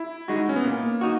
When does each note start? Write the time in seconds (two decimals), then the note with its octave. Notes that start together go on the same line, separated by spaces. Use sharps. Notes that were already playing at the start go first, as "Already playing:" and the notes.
Already playing: E4
0.28 G#3 D#4 F#4
0.49 C#4
0.56 B3
0.64 A#2 A#3
1.01 D#4 F#4